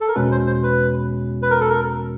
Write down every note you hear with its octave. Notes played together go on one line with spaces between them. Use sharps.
A4
A#4
E2 B2 G#3 C#4 F#4 B4
C5
C5
B4
B4
A#4
A4
A#4